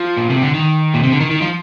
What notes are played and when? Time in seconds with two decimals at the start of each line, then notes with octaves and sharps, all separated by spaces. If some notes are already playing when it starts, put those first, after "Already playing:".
Already playing: F3
0.17 A#2
0.30 C3
0.42 D3
0.54 D#3
0.94 A#2
1.03 C3
1.12 D3
1.20 D#3
1.31 D#3
1.41 F3